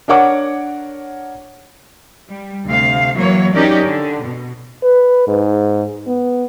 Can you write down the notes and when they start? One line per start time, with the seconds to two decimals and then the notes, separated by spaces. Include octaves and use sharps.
0.08 D4 A#4 C#5 F#5 D6
2.29 G3
2.65 D2 C3 F5
3.14 E3 F#3 A#3 C#5
3.53 F#3 C#4 D#4 G4 A#4 D5
3.85 D3
4.23 B2
4.83 B4
5.28 G#2
6.07 B3